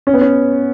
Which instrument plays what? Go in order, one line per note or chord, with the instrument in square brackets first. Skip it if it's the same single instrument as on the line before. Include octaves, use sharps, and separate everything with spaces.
[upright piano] C#4
B3
C#4